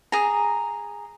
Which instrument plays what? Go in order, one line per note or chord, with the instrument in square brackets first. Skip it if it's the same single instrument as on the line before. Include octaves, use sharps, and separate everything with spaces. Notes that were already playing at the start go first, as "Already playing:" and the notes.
[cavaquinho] G#4 A#5